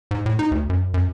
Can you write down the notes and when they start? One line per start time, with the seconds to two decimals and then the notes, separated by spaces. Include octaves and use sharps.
0.11 G#2
0.26 A2
0.39 D#4
0.51 D2
0.70 F#2
0.94 F#2